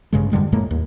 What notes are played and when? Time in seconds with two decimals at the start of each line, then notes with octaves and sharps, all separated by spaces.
0.13 A1 G2 C#3 G#3
0.31 F2 D3 G3 G#3
0.52 F2 A2 G#3 A#3
0.71 D#2